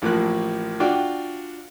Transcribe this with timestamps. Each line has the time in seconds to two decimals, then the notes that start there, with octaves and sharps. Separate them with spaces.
0.02 A1 A2 F3 A#3 F#6
0.80 D4 F4 F#4 D5 G5